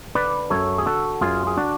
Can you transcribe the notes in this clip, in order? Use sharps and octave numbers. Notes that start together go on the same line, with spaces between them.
D3 B4 D5
F#2 A4 C#5
G#4
D3 F#4 A4
F#2 F4 G#4
G#4
D3 D4 F#4